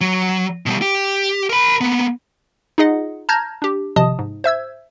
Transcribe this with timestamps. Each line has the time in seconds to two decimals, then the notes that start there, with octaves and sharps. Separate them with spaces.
0.01 F#3
0.66 B2 G3
0.82 G4
1.50 A#4 B5
1.81 A#3 B3
2.78 D#4 F4 G#4 D#5 F#5
3.29 A5 A#5 F6 G6 G#6 A#6
3.62 D4 G4
3.96 G#1 C3 F3 D#5 A5 D#6
4.19 G#2
4.44 C5 E5 E6 G#6